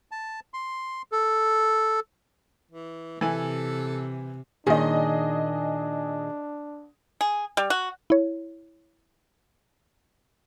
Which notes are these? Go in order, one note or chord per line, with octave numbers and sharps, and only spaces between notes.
A5
C6
A4
E3
C3 E3 A4 G#5
A#2 D#3 C#4 D4 G#4 D#5
G#4
G3
F#4
E4 C#5